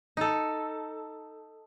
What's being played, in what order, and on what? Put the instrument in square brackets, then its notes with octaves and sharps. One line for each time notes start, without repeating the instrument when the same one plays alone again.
[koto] D#4 A4